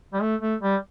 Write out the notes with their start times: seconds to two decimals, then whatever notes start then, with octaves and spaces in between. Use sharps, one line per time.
0.13 G3
0.22 A3
0.41 A3
0.62 G3